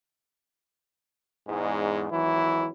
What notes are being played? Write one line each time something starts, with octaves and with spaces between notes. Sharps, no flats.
E2 G#2
G#1 E3 F#3 E4